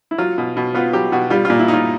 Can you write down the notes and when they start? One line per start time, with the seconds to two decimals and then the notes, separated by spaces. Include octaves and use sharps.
0.11 E4
0.18 F#3 F4
0.38 B2
0.57 B2
0.74 B3 F4
0.93 F#3 G4
1.12 B2 F#4
1.30 G3 F4
1.45 A#2 F4
1.59 E4
1.68 D#4
1.73 F4